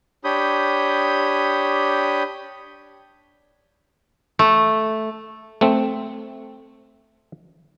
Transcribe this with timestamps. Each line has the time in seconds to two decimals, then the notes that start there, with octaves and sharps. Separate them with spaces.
0.24 D4 G4 C#5 B5 D#6 G6
4.39 A3
5.61 A3 C4